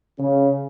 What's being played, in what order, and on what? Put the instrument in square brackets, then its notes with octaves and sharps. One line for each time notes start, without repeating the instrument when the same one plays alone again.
[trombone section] C#3